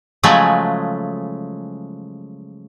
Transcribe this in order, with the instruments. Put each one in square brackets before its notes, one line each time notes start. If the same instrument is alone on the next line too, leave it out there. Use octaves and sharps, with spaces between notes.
[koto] C#3 F3 F#3 G#3 A3